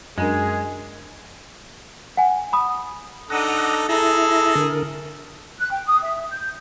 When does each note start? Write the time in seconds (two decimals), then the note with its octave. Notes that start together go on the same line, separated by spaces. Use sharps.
0.18 F#2 G#3 C#4 D4 G#4 A#4
2.17 F#5 G#5
2.53 B5 D#6
3.30 D4 D#4 A4 F#5 A#5 D#6
3.89 E4 G#4 A4 A#5
4.55 D3 A#4
5.59 F#6
5.71 G5
5.87 D#6
6.03 E5
6.31 G6